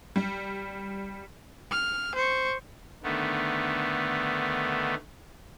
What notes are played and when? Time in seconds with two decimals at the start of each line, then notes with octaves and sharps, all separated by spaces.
0.16 G3
1.71 F6
2.15 C5 C#6
3.03 D3 D#3 A3 B3